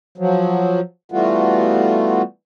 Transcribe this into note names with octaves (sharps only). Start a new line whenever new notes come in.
F3 F#3
E3 G3 A3 B3 F4 F#4